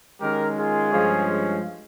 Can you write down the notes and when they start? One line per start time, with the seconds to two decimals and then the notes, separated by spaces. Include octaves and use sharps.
0.21 D#3 G#3 C#4 G4 A#4
0.57 F4 G#4
0.92 G2 F3 G#3 C#4